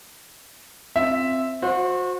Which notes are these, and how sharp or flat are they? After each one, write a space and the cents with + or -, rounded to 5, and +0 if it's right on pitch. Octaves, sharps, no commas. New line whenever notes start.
C4 +0 F4 +0 E5 +0
F#4 -30 C5 +5